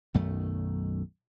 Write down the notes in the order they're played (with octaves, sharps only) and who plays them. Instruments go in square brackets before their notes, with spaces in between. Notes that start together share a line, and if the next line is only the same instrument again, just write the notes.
[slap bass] B1 F#2 D#3 A3